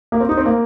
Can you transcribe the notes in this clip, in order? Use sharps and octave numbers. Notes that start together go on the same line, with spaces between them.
A#3
C4
D#4
C4
A#3